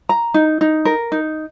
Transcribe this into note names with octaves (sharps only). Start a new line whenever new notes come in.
A#5
D#4
D#4
A#4
D#4